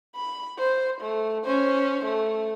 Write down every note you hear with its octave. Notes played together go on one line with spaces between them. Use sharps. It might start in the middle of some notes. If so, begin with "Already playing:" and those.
B5
C5
A3
C#4 C5
A3